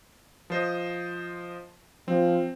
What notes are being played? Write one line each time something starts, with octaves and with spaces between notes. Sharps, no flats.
F3 C5 D#5
F3 C4